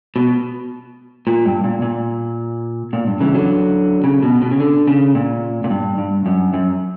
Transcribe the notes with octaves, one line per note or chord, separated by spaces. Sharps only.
B2
A#2
G2
A#2
A#2
A#2
G2
C#3 E3
D3 F#3
C#3
B2
B2
C#3
D3
C#3
A#2
A#2
G2
G2
F#2
F#2